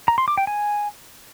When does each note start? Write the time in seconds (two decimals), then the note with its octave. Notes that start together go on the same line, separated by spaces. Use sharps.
0.08 A#5
0.18 C6
0.28 D6
0.37 G5
0.47 G#5